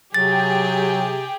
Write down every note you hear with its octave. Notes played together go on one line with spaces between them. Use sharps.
C3 F#3 G4 G#4 G5 A6